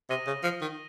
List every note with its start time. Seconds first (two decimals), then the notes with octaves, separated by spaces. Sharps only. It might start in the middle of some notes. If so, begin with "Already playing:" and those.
0.10 C3 D#6 A#6 D#7 G7
0.27 C#3
0.43 F3
0.61 D#3